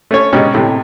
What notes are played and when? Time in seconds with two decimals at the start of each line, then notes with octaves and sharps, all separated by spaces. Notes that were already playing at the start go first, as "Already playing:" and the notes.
0.11 A3 C#4 C#5
0.33 G#2 B2 C#4 G4
0.54 A2 C3